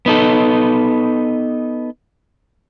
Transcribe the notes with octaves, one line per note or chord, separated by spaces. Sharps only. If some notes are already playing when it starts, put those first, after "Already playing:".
B3 D#4 A4